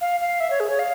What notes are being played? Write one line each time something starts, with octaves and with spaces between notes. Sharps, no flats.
F5
F5
E5
C#5
G#4
C#5
F5